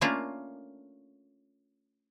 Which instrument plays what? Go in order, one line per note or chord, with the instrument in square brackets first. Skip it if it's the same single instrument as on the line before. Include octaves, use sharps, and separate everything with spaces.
[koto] A3 A#3 C#4 D4 F4